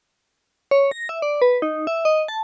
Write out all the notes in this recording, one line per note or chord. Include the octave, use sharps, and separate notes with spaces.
C#5
A#6
E5
D5
B4
D#4
E5
D#5
A5